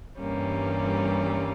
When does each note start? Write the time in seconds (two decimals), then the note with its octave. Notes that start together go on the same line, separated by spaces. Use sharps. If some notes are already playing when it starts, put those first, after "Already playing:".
0.19 G2 E3 G3 A#3 C#4